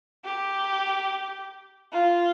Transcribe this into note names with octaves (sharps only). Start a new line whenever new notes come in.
G4
F4